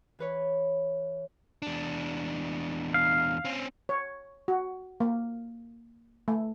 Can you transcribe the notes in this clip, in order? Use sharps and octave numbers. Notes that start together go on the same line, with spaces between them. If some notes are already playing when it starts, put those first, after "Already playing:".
E3 B4 C#5
E2 D4
F5
C4 C#4
C#5
F#4
A#3
A3